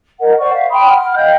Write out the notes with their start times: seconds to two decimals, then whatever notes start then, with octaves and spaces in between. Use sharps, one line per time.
0.20 A#4 D#5 F#5
0.39 C5 D5 F#5 C#6
0.53 E5 F5
0.70 G5 B5 C6 D#6
0.89 F#5 F6
1.15 D#5 F5 G5 G6